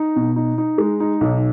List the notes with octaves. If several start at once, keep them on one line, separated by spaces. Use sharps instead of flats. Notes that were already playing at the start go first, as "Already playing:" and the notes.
Already playing: D#4
B2
D#4
D#4
G#3
D#4
B1